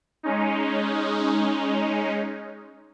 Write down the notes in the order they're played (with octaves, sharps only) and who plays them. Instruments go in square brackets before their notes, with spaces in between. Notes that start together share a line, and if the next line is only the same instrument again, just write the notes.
[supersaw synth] G#3 C#4 D#4